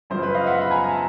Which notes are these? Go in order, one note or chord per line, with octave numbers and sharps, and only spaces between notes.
F#2 C#3 F3 C5
B4
D#5 F5
E5 F#5
B5
G#5 A#5
A#5
A5